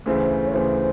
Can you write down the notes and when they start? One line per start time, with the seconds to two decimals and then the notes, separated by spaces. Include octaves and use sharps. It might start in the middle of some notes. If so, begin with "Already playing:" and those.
0.06 D2 C#3 E3 C5
0.47 C#5
0.54 D2 C#3 E3 C5